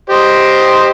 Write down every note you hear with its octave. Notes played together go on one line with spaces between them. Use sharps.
G4 C5 D#5